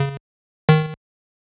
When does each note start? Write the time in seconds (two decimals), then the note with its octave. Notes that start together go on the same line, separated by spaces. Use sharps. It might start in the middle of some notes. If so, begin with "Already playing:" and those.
Already playing: C#3
0.69 D#3